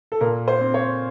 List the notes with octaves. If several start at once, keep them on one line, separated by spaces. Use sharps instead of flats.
A4
A#2 A#4
C5
C4
C#5